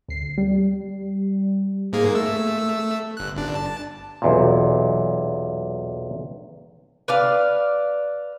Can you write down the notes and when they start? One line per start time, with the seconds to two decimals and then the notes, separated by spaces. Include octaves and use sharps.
0.08 D2 C7
0.38 G3
1.93 G#2 A#3 G#4
2.14 A3 E6
3.17 G1 F#6
3.36 G1 D4
3.55 A5
4.22 B1 E2 A#2
7.08 B4 D5 F5